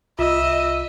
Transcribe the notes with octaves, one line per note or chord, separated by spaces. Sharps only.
C2 F4 D#5 E5 E6